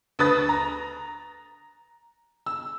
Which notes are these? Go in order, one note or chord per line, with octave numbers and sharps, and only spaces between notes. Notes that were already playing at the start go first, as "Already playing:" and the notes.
D2 B4 D#6 A6
A#5
E6